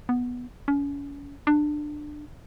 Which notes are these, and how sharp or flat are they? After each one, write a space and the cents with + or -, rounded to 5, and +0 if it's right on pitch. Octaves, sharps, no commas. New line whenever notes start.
B3 -5
C#4 +35
D4 +20